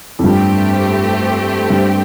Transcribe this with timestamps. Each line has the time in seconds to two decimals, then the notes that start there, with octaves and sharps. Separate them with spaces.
0.19 F2
0.24 G2 A3 C4 G4
1.70 G2